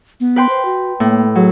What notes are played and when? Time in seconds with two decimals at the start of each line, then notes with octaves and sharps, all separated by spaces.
0.20 B3
0.36 B4 G5 C6
0.49 C5
0.65 F#4
1.00 A2 A#3
1.35 F#3 G#4